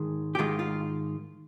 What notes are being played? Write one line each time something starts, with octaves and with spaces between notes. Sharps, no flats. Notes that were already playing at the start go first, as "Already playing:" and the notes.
Already playing: G#2 D#3 G#3
G4
G#2 D#3 G#3 F4
F4